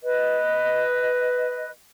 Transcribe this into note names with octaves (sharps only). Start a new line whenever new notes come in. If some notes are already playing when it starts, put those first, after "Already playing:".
B4 D#5